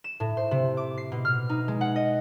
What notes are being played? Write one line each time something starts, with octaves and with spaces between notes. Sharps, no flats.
E7
A2
C5
C3
D6
C7
B2
F6
D#4
G#3
F#5
D#5